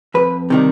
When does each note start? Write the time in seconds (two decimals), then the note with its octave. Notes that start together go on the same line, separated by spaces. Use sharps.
0.14 F2 B4
0.50 C3 D#3 G3